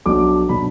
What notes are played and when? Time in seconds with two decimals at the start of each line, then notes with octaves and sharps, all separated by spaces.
0.06 B1 B2 F#3 D4 D6
0.49 B2 F#3 D4 B5